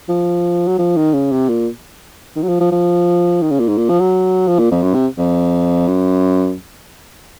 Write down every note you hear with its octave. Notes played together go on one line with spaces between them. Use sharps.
F3
F#3
F3
D#3
C#3
C3
A#2
D#3
F#3
F3
F3
F3
D#3
C#3
A#2
G#2
A#2
F3
F#3
F3
A#2
F2
F#2
C3
F2
F#2